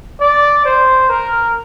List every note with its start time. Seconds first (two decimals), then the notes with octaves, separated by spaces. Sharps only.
0.20 D5
0.65 C5
1.10 A#4